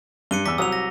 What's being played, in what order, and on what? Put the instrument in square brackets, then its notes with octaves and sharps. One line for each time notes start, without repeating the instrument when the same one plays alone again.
[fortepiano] G2 [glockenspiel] C#7 D#7 G7
[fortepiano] E2 E6 [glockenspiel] D6 B6
[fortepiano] C2 F#3 D#6 [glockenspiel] E6 F7
[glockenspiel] A#6